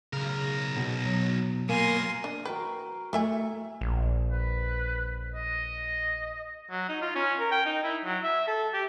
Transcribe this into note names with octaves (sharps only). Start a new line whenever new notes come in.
B1 C#3 A#4
B2
F#3
B2 A#3 A#4 G#5 C6
D4
F#4 A#4 B4 G5
E3 A3 E5 G#5
A#1
B4
D#5
F#3
D#4
F4
C#4
A#4
G5
D#4
E4
F#3
E5
A4
G4